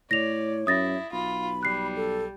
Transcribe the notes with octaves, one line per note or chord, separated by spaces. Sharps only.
A2 C#5 D5 A#6 F7
F#2 E4 D#6 A6 A#6
B1 F4 B5
G3 F#6 C7
A4